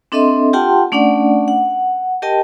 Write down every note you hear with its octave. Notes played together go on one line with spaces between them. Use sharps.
C4 D4 A4 D#5 E5 C6
F4 G4 F#5 G5 A5 C6
A3 C#4 D4 D5 F#5
F#5
G4 A#4 D#5 G5 A5